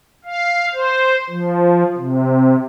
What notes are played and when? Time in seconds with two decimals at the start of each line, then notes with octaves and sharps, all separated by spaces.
0.25 F5
0.73 C5
1.30 F3
1.97 C3